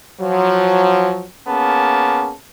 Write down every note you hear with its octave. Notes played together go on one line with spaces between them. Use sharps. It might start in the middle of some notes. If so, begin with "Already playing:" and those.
F3 F#3
A#3 B3 C#4 G#4 A5